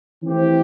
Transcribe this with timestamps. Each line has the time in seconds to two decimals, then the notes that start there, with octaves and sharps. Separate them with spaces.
0.22 E3 A3 C4 G4